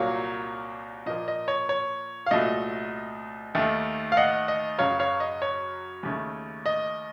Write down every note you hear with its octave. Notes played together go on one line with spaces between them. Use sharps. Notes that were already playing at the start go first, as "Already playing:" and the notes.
Already playing: C2 A#2 F#3 A#3 C#5 F5
A#2 F3 A#3 D#5
D#5
C#5
C#5
F5
C2 A#2 F#3 A3 D#5
D#2 D#3 A3
F5
D#5 F#5
D#5
F#2 C#3 F#3 C#5 F5
C#5 F5
D#5
C#5
D#2 C#3 A3
D#5